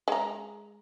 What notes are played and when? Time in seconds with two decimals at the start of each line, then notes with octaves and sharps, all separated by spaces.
0.08 G#3 A#5